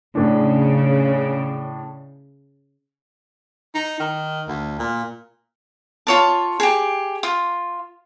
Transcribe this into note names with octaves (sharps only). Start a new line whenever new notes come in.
A2 C#3 D4
D#4
D#3
D2
A#2
F4 C#5 A5
G4 G#4
F4